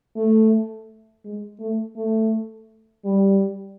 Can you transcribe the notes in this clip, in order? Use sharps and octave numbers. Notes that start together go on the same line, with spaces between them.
A3
G#3
A3
A3
G3